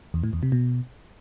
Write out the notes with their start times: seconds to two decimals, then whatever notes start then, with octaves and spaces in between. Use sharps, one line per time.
0.14 E2
0.24 A2
0.33 E2
0.43 C3
0.52 B2